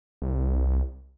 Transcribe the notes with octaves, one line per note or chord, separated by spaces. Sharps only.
C2